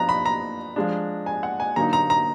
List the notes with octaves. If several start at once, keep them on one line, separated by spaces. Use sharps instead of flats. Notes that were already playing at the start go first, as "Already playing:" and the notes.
Already playing: F3 B3 D4 A#5
B5
A#5
F3 G#3 D4
G#5
F#5
G#5
D3 F#3 A#3 D#4 A#5
A#5
A#5